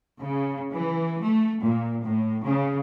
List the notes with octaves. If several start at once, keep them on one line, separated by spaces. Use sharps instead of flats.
C#3
E3
A3
A#2
A2
C#3